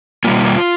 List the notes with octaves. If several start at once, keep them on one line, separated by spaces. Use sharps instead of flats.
B2 G3 A#3 F4